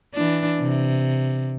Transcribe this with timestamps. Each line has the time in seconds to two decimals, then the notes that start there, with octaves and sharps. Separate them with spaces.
0.14 E3 D4
0.60 C3